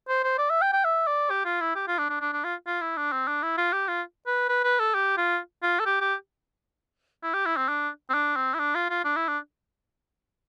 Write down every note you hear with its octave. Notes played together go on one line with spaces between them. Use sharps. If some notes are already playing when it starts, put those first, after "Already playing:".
C5
C5
D5
E5
G5
G5
E5
D5
G4
F4
E4
G4
F4
D4
D4
D4
D4
F4
F4
E4
D4
C4
D4
E4
F4
G4
F4
B4
B4
B4
A4
G4
F4
F4
A4
G4
G4
E4
G4
E4
C4
D4
C4
D4
C4
E4
D4
F4
F4
D4
E4
D4